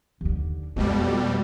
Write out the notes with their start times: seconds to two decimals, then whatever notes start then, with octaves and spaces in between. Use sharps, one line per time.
0.21 D#2 D3
0.76 F2 B2 G3 G#3